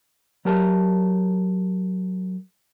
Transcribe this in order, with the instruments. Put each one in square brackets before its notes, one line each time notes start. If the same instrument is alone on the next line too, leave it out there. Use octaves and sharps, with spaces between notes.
[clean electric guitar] F#3 G4 A#4 A5